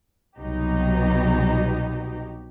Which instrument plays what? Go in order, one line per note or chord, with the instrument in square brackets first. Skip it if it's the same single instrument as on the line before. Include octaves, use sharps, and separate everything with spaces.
[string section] C2 B2 F#3 B3 D#4 G4